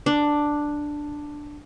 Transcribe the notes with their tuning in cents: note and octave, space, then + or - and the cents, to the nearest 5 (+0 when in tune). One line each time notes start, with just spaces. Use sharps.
D4 +5